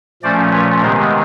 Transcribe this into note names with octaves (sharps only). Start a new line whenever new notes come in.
A#2 F3 A3 C#4 C5 D5
B4 C#5
C3 D#3 G#3 B3 A#4 C5